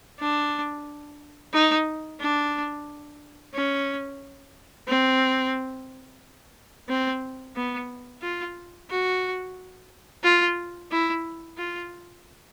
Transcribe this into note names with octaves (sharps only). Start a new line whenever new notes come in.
D4
D#4
D4
C#4
C4
C4
B3
F4
F#4
F4
E4
F4